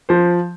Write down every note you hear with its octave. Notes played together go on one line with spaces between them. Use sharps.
F3 C5